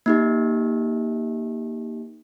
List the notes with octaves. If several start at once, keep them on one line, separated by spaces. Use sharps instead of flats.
A#3 D#4 G4